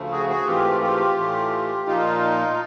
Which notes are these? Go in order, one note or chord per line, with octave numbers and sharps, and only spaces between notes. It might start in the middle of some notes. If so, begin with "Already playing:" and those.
Already playing: D2 C#3 F3 A3
F#4 G#4
F#4 G#4
G#2 E3 A3 C4 F4 G4
F4 G4
A2 E3 A3
A#2 F3 A#3 D#4 F4